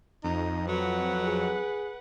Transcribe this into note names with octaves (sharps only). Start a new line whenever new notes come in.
F2 D#4
F#3 B4 F#5
G#4